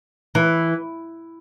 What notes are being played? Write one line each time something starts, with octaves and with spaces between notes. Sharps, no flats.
E3